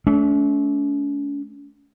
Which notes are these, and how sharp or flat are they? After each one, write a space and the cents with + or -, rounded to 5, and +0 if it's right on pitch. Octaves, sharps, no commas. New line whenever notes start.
A3 -30 C#4 +45